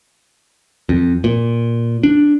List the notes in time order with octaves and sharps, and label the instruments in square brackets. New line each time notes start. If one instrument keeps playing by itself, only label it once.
[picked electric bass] F2
A#2
D4